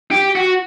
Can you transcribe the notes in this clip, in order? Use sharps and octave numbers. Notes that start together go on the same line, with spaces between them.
G4
F#4